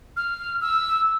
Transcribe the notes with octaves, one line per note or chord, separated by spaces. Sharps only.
F6
E6